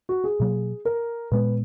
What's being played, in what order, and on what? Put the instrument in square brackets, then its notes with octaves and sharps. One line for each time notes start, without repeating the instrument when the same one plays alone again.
[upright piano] F#4
G#4
[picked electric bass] B2 F#3 A#3
[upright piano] A#4
[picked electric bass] A#2 G#3 B3 [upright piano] B4